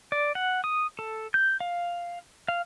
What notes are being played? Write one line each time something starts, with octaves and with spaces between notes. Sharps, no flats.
D5
F#5
D#6
A4
G6
F5
F5